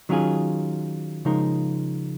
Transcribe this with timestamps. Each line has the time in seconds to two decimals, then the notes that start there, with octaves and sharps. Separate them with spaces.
0.09 D#3 F#3 C#4 F4 G#4
1.25 C#3 F3 G#3 D#4 A#4